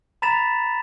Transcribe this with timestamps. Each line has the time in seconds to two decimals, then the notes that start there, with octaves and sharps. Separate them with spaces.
0.22 A#5 B5 A6 B6 E7 F7